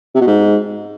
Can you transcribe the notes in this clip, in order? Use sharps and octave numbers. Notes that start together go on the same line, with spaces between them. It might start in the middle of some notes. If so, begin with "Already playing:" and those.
C3
B2
G#2